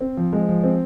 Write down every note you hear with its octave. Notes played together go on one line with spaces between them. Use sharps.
C4
F3
G#3
F3
C4